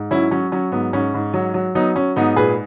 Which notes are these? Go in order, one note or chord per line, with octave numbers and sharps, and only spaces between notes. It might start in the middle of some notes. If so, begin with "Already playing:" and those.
Already playing: G#2
F#3 C#4 E4
F#3 C#4
F#3 C#4
G#2 B3
G#2 C#4
G#2
F#3
F#3
F#3 B3 D#4
F#3 C#4
G#2 B3 D#4
A#2 G#4 B4